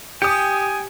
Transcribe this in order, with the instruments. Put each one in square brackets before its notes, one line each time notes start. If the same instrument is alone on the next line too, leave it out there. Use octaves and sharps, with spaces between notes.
[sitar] G4 [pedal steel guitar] G5 [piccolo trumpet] G#5 [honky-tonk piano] D#6 C#7